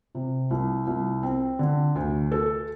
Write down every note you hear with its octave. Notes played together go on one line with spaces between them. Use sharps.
C3
C2
C2
C4
D3
D2
A4